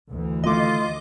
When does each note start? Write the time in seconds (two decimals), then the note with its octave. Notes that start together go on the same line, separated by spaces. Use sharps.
0.10 D2 E3
0.44 D#3 A3 F4 D#5 D6